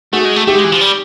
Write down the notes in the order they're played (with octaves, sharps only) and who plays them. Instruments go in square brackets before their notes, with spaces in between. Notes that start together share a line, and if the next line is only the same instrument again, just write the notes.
[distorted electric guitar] A3 [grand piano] F#4 G#4
[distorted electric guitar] G#3
A3
[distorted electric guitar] A3 [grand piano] G4
[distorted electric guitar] G#3
E3
F3
G3